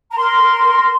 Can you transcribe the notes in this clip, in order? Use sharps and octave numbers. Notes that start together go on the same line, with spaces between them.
A#5
A#4 C6
A#4
A#4